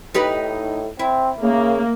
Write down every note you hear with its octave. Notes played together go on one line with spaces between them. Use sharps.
A2 D#4 G4 B4
C4 E4
C#3 A#3